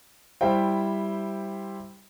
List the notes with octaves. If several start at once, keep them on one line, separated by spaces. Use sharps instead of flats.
G3 E4 C5 E5 G5